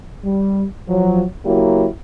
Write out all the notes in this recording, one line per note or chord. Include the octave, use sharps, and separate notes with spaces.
G3
F3 F#3
C#3 F#3 A#3 E4 F#4 G4